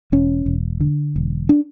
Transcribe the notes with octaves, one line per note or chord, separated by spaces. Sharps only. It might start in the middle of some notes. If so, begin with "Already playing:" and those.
E1 C#4
E1
D3
E1
D4